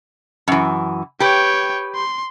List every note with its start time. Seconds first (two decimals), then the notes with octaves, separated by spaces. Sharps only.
0.48 F#2 E3
1.20 G4 B4 C#5 G5
1.95 C6